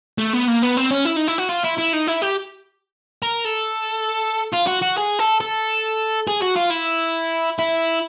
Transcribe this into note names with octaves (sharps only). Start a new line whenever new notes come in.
A3
B3
A#3
B3
C4
C#4
E4
D#4
E4
F#4
F4
E4
E4
D#4
E4
G4
A#4
A4
F4
F#4
F#4
G#4
A4
A4
G#4
F#4
F4
E4
E4